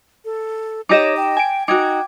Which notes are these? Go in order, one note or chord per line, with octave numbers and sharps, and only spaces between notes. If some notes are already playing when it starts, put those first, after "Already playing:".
A4
D#4 G4 C#5 D#5 D6 A#6 E7
G5
G#5 D7
D#4 F#4 G5 D6 G#6